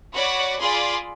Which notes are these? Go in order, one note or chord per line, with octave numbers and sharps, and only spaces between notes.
F#4 C#5 D5 F#5 B5
F4 G#4 D5 B5 C6